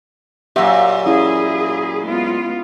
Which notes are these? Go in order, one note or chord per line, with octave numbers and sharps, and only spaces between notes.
F#2 A#2 G4 E5 F#5
C#4 E4 G#4
G#3 B3 F4